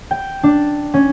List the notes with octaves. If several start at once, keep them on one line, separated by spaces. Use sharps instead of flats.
G5
D4
C#4